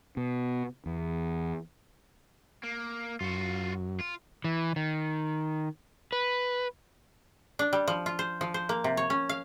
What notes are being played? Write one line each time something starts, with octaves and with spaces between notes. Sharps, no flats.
B2
E2
A#3
F#2 F4 F#4
F4
E3
D#3
B4
D4
G3
F3
F4
C5
F3
C5
A#3
C3
C#5
C#4
F5